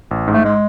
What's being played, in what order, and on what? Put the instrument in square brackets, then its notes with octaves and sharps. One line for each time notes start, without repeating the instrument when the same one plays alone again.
[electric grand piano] A1
G#2
[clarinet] A3
G#3